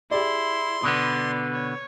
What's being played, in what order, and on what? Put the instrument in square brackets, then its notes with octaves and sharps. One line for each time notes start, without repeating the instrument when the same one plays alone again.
[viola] E4 [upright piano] G4 G#4 D5 [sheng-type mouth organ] C6
[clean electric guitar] B2 D3 B3 [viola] D5 [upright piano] D#6
[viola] C#5